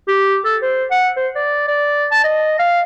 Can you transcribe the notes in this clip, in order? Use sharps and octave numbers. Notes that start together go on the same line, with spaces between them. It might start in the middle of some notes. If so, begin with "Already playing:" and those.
G4
A4
C5
F#5
C5
D5
D5
A5
D#5
F5